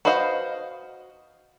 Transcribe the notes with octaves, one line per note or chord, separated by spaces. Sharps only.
F#4 B4 C5 D#5 F5